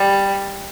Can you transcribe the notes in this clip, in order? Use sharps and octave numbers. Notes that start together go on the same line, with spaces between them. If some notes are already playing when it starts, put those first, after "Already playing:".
Already playing: G3